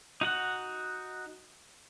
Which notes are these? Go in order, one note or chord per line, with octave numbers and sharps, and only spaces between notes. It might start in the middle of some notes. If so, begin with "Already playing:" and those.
D#4 F#4 F#5